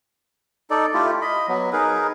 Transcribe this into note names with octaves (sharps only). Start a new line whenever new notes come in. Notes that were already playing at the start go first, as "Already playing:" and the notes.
D#4 A4 D5
A3 E4 F4 G4
D#5 B5
F#3 B3
D#4 G#4 A#4 B4